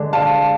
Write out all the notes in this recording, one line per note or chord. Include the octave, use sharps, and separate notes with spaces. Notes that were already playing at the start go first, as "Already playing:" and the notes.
Already playing: D3 G#3 D4
F5 A5